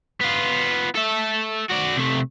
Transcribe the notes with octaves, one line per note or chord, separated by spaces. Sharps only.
B3 F4
A4 E5
F#4 D5
C3 A3